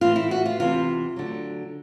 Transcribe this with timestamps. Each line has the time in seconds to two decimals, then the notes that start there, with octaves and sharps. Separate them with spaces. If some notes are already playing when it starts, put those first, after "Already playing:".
0.01 A2 E3 F4
0.16 E4
0.31 F#4
0.46 F4
0.60 E2 C3 E3 F4
1.16 D2 D3 F#3